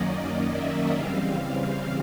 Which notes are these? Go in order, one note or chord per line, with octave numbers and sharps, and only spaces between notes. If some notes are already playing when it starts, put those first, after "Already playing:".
Already playing: F#2 D#3 F#3 A#3 C#4 D5 D#5
E5
C#3 E3 G3 C4 F5